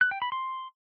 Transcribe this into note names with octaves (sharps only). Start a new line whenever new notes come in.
F#6
G5
B5
C6